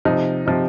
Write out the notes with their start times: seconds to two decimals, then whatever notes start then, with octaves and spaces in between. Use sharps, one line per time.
0.05 C3 F3 D#4
0.46 C3 F3 D#4